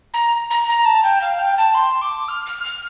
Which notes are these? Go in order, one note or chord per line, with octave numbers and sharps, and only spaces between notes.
A#5
A#5
A#5
A5
G5
F5
G5
A5
C6
D6
F6
F6
F6